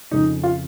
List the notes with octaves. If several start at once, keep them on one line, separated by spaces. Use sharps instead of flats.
F2 C#3 D#4
F4